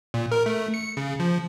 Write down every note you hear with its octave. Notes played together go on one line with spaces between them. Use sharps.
A#2
A#4
A3
C#7
C#3
F3